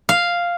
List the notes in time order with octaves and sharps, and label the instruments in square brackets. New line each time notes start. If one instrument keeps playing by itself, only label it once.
[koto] F5